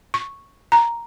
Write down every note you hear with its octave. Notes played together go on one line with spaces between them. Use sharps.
C#6
A#5